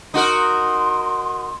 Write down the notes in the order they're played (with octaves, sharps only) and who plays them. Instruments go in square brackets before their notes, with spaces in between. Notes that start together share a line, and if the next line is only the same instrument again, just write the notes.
[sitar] D#4 F#4 A#4 [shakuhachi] C6